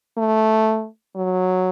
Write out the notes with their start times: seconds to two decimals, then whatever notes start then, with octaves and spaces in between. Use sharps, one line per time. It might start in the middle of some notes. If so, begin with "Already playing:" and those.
0.18 A3
1.16 F#3